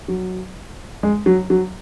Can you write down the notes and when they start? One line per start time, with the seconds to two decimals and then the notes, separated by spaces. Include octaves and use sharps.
0.08 F#3
1.03 G#3
1.26 F#3
1.50 F#3